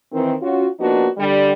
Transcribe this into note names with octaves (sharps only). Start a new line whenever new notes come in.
D#3 E3 C4
C#4 F4 F#4
F3 A#3 B3 D4 D#4 F#4
D3 G3